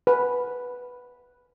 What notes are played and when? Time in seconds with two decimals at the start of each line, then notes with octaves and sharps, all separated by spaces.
0.07 B4